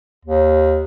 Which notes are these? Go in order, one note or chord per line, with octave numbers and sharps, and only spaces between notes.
D#2